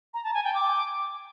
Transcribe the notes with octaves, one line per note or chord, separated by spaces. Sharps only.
A#5
A5
G#5
G5
D6